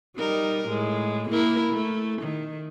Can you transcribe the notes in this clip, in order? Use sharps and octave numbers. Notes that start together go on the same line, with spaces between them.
G3 D#4 A#4
A2 G#3
A#3 E4 A#4
A3
D#3